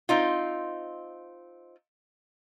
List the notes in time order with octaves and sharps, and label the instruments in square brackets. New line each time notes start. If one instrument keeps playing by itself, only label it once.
[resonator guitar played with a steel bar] C4 D#4 F4